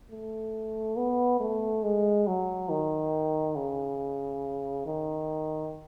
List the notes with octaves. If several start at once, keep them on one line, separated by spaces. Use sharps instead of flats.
A3
B3
A3
G#3
F#3
D#3
C#3
D#3